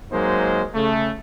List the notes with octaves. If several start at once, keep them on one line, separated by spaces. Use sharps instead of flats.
F#3 G#3 A#3 D#4 C5
C#3 A3